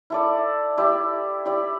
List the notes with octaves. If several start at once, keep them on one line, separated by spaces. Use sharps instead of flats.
E4 A4 D5
E4 G4 D5
E4 G4 D5